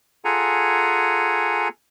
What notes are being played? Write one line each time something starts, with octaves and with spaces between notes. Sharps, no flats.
F4 G#4 A4 F#5 G#5 A#5